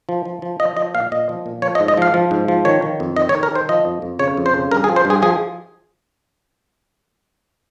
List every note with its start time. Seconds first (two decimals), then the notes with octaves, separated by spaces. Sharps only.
0.09 F3
0.25 F3
0.42 F3
0.60 F3 D#5
0.77 F3 D#5
0.95 A#2 F5
1.12 A#2 D#5
1.29 F3
1.46 A#2
1.62 F3 C#5
1.75 D#5
1.80 G#2
1.88 D#5
1.97 F3 F5
2.14 F3
2.31 G#2
2.48 F3
2.65 D#3 C#5
2.82 D#3
3.00 F2
3.16 D#3 D#5
3.29 C#5
3.34 D#3
3.43 A#4
3.51 D#3 C5
3.69 F3 D#5
3.85 F2
4.02 F2
4.19 C#3 C#5
4.37 F2
4.46 C5
4.54 C#3
4.71 G2 A#4
4.84 G#4
4.89 F3
4.96 C5
5.05 G2
5.10 G#4
5.22 F3 G#4